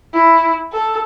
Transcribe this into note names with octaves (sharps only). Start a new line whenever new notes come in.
E4
A4